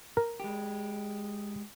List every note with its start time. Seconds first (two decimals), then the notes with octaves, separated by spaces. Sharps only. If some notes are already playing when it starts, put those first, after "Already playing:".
0.17 A#4
0.40 G#3 G4